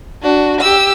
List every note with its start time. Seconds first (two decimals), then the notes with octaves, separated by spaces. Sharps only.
0.22 D4 F#4
0.60 G4 E6